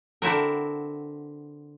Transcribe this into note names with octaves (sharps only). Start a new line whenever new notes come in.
D3 C4 E4 F#4 A#4